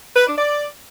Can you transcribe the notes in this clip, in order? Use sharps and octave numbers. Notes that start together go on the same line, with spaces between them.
B4
D4
D5